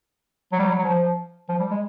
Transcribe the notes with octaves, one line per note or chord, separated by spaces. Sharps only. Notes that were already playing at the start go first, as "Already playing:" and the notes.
F#3
G3
F#3
F#3
F3
F3
G3
G#3